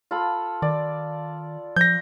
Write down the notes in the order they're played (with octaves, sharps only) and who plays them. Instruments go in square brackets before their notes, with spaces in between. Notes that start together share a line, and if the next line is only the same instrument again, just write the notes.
[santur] F4 A4 B5
[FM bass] D#3 [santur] D5
[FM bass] F3 [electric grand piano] G6 A#6